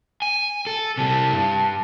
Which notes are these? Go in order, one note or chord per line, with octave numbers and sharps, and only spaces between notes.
G#5
A4
C3 G3 A5
G2